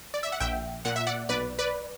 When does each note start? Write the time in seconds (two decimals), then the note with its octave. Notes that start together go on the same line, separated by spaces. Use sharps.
0.14 D5
0.23 E5
0.32 F#5
0.40 A#1 E5 G5
0.85 A#2 F#5
0.96 E5
1.07 D5 F#5
1.29 B1 B4 D5
1.59 B4 D5